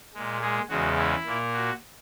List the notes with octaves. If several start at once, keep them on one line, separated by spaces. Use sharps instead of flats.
A#2 G#3
G#3 G#4
E2 C#3 G#3 F#4
E4
A#2 A#3
F#4